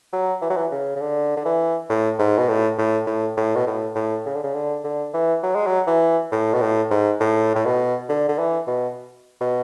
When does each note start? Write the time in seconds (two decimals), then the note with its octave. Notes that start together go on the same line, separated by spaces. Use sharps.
0.13 F#3
0.42 E3
0.50 F#3
0.57 E3
0.71 C#3
0.96 C#3
1.01 D3
1.37 D3
1.45 E3
1.89 A2
2.19 G#2
2.38 B2
2.49 A2
2.78 A2
3.07 A2
3.37 A2
3.55 B2
3.67 A2
3.95 A2
4.26 C#3
4.35 D3
4.43 C#3
4.54 D3
4.84 D3
5.14 E3
5.43 F#3
5.55 G#3
5.67 F#3
5.87 E3
6.32 A2
6.53 B2
6.61 A2
6.91 G#2
7.20 A2
7.55 A2
7.65 B2
8.09 D3
8.29 D3
8.39 E3
8.67 B2
9.41 B2